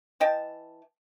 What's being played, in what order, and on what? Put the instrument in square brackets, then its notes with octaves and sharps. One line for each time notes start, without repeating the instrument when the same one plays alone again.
[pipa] E3 D#5 G5 A5